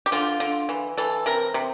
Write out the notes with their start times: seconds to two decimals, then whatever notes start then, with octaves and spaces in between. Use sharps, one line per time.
0.06 G4
0.12 D3 F4
0.40 D3
0.69 E3
0.98 E3 A4
1.26 C3 A#4
1.54 C3